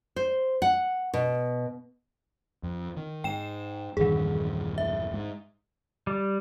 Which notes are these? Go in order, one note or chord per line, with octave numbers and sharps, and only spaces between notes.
C5
F#5
B2
F2
D#3
G#2 G5 E7
A#1 E2 G2 D#3 G#4
E5
G#2
G3